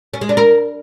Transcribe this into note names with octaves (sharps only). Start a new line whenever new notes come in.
C#4
G#3
D4
A#4